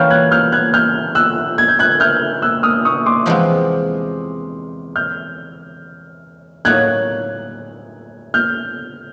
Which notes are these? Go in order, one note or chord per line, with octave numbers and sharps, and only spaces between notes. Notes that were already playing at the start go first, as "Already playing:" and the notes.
Already playing: E3 G3 A#3 C#4 F4 F6 G6
F#6 G#6
F6 G6
F#6 G#6
F6 G6
E6 F#6
G#6
G6
F#6 G#6
F6 G6
E6 F#6
D#6 F6
C#6 D#6
C6 D6
E2 C3 F3 G#3 B3
F6 G6
A2 F#3 A#3 D#4 F#6 G#6
F6 G6